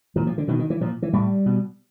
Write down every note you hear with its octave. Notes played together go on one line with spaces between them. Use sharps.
A#2 E3
F3
D3
B2 D#3
D#3
E3
A#2 F3
E3
A2 G3
B2